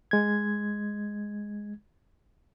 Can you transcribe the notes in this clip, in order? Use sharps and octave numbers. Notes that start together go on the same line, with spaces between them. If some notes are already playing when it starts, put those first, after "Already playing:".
G#3 G#6